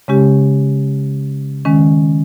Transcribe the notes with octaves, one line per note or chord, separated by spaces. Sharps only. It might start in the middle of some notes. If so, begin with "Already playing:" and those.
C#3 G#3 C#4 G4
D#3 G#3 C#4